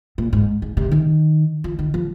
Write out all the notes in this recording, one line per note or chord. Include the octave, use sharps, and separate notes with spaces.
A#2
G#2
G#2
C3
D#3
F3
D#3
F3